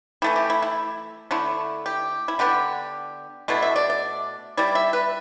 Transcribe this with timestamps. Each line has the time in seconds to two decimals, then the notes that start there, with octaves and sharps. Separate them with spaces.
0.22 E3 A3 E4 G4
0.36 G4
0.50 E4
0.62 E4
1.31 D3 A3 E4
1.86 G4
2.28 E4
2.39 D3 B3 D4 G4
3.48 B2 A3 D4 E4
3.62 E5
3.76 D5
3.90 D5
4.57 G3 E4 D5
4.75 E5
4.93 B4